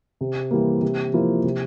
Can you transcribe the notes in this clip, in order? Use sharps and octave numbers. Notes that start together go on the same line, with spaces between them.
C3
E3 G3 A#3
C3
F3 A#3 E4
C3